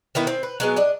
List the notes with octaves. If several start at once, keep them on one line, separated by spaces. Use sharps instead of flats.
D#3 B3 E4
C4
B4
F#3 G#3 B3
D4 D#5